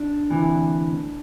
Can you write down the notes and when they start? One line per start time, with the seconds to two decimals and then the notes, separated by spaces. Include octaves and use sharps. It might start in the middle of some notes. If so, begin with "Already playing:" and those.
Already playing: D4
0.30 D2 C3 E3